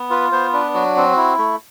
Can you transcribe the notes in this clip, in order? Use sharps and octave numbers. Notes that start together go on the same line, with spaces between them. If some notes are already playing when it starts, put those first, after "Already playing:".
Already playing: B3
F4 B4
B3 C5
D4 B4
F#3 F#4
C4
E4
A3